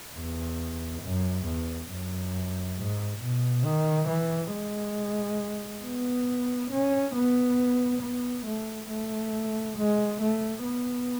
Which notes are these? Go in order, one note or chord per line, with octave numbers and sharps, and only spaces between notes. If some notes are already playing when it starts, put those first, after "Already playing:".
E2
F#2
E2
F#2
G#2
B2
D#3
E3
G#3
B3
C#4
B3
B3
A3
A3
G#3
A3
B3